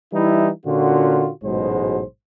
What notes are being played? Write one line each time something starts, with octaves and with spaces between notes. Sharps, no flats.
E3 G3 D#4 E4
A#2 D3 C#4 F4 F#4
A1 G#2 B2 F#3 G#3 C5